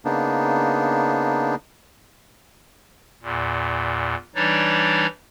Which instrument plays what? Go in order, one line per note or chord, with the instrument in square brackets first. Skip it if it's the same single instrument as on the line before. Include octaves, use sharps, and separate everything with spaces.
[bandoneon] C#3 A#3 B3 D4 D#4
[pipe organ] E2 A#2
E3 G3 D4 D#4 C#5 D5